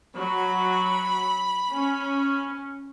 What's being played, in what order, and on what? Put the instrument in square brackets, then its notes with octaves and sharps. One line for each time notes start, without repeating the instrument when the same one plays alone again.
[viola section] F#3 [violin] B5
[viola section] C#4